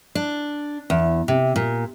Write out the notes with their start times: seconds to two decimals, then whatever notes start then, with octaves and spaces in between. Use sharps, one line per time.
0.15 D4
0.90 E2
1.28 C3
1.56 A#2